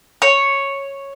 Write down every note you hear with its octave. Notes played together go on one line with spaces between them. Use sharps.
C#5